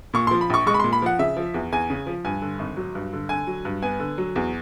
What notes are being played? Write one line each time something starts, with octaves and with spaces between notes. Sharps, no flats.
A#2 C#6
F3 C6
B5
A#1 C#6
G#3 C#6
B5
C6
A#2
B5
F3 F#5
C#3 E5
F3
E2
E2 G#5
C#3
F3
G2 G#5
D3
G#1
F#3
G2
D3
D3 G#5
F#3
G2
B3 G#5
D3
F#3
E2